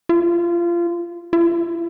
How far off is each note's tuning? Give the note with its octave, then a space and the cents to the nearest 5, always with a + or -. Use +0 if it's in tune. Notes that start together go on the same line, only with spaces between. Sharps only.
F4 -25
F4 -45